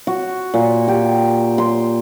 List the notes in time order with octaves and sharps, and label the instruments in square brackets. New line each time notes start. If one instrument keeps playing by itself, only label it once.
[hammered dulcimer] F#4
A#2
G4
C6